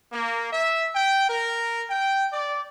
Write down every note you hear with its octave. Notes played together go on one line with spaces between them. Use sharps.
A#3
E5
G5
A#4
G5
D5